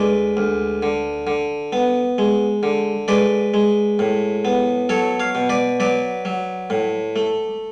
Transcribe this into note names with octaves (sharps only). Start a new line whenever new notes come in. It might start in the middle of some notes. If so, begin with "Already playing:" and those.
Already playing: D2 G#3 B4 D5
D2
D3
D3
B3
G#3
D3
G#3 B4 D5
G#3
A2
B3
F#3 A4 C#5
C#5 F5
B2
B4 D5
F#3 B4 D5
F#3
A2
A3